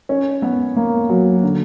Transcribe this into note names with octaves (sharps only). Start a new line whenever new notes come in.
C#4
B3
A#3
F#3
D3